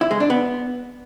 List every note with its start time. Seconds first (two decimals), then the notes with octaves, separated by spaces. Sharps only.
0.01 E4
0.11 G#3
0.20 D4
0.30 B3